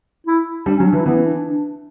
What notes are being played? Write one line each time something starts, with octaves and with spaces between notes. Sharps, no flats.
E4
G3 D4
C#4
F#3
D4
E3
E4
E3 B3
C#4
D4
D4
D4